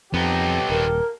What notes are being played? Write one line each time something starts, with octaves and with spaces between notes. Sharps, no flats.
F2 B3 D#4 G4 A4
D#1 A#4